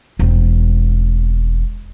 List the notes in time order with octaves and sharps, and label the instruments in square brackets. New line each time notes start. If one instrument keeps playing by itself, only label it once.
[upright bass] E1 C4